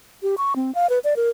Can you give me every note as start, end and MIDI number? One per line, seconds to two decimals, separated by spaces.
0.23 0.35 67
0.38 0.54 85
0.56 0.74 60
0.75 0.89 77
0.89 0.99 71
1.04 1.14 74
1.16 1.29 70